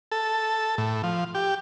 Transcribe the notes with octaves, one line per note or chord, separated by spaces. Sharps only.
A4
A2
F3
G4